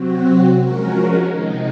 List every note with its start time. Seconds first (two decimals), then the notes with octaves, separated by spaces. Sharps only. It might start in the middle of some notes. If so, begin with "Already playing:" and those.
Already playing: C3 F#3 C4 F#4
0.58 F3 G#3 C#4 F#4 A#4
1.27 C3 D#3 G#3 D#4